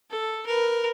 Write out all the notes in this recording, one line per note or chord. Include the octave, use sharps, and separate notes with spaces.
A4
A#4 B4